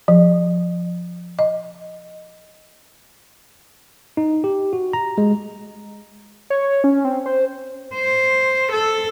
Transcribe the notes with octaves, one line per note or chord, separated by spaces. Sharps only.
F3
D#5
D#4
G4
F#4
A#5
G#3
C#5
C#4
C4
C5
C5
A4